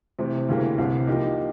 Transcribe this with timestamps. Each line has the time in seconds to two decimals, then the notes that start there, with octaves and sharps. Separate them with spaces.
0.19 C3 E3 A3 C4
0.49 D2 C#3 E3 G3 A#3
0.78 C2 C3 E3
1.07 F3 A#3 D#4 G4